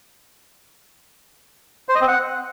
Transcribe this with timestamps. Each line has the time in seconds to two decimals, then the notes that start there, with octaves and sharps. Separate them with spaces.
1.89 C5
1.95 D#5
2.01 C4
2.08 F#5